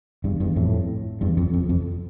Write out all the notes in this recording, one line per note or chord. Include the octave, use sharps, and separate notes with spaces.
E2 G2
E2 G2
F2 A2
E2 G2
F2
F2
F2